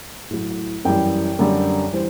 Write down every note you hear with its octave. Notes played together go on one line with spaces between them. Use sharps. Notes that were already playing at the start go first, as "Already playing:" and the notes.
A2 F#3
F#2 E3 G3 G5
F#2 D3 G3
E3 G3 C5